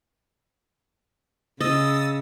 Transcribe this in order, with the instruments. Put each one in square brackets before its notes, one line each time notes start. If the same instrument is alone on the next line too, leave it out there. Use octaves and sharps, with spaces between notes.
[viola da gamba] C#3 [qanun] D#5 [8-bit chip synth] D#6 E6 A6